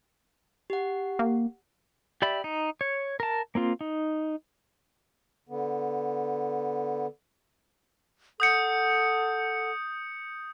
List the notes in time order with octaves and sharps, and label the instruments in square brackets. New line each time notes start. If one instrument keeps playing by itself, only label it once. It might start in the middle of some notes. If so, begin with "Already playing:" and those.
[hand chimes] G4 F#5
[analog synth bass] A#3
[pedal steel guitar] G4 D5 E5 B5
D#4
C#5
A#4 A5
A#3 C4 F4
D#4
[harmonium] D3 B3
[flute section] A4 F#5 [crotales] D#6 G6 C#7